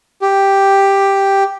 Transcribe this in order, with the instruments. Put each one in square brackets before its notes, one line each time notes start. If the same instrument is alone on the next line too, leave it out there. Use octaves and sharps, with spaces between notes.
[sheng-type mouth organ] G4